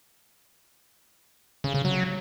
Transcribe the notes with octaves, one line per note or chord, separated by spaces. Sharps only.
C#3
C#3
F#3